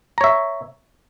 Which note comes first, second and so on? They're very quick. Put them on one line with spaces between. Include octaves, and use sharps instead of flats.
A#5 C#5 E5